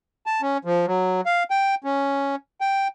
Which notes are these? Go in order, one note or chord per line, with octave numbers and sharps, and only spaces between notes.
A5
C#4
F3
F#3
F5
G5
C#4
G5